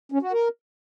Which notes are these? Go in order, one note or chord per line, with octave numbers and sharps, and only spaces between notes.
C#4
F#4
A#4